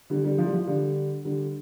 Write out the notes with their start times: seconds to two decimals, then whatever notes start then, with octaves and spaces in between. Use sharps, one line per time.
0.10 D3 G3
0.25 D3 G3
0.38 F3
0.46 G3
0.53 F3
0.67 D3 G3
1.25 D3 G3